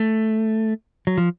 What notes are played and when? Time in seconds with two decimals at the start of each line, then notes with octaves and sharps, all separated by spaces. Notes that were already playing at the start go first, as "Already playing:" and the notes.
Already playing: A3
1.07 F#3
1.18 F3